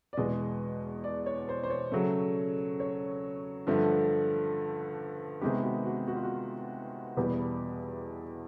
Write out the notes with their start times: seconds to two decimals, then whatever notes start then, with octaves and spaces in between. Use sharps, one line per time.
0.13 D5
0.17 E2 B2 G#3 D#5
1.04 D5
1.26 C#5
1.49 C5
1.63 C5
1.70 C#5
1.92 C#3 F#3 A3
2.80 C#5
3.67 G2 D3 F3 A3
5.41 C3 D#3 G#3 B3 G4
5.64 F#4
5.86 F#4
6.08 F#4
6.16 F4
6.23 F#4
7.17 E2 B2 G3 B3 G4